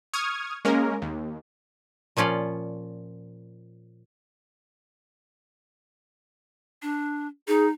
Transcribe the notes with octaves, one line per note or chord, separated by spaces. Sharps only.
C#6 D#6 F6 G#6
G#3 A#3 C#4 A#4
D#2
A#2 F3 C#4 F4 D5
D4
D#4 G#4